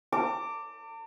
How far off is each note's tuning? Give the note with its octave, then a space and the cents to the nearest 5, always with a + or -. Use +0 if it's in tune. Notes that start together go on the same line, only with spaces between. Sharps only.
A5 +45 D6 +0